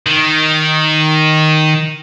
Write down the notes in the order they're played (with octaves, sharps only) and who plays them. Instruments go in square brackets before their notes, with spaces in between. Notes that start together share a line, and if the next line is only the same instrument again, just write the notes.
[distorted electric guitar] D#3